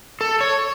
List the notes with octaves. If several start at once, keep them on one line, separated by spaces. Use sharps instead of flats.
A4
C#5